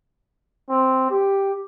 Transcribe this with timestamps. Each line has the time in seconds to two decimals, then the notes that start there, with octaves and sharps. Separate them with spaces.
0.70 C4
1.11 G4